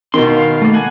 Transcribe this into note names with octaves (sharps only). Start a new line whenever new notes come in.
B2 D#3 C6
F5
A3 A#3
F#5 G#5